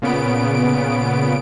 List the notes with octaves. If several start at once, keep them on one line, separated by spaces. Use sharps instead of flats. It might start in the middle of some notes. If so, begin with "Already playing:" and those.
A#2 C#3 B3 D7